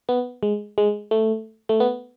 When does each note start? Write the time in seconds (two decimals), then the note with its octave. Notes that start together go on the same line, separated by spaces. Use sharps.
0.09 B3
0.43 G#3
0.78 G#3
1.11 A3
1.69 A3
1.80 B3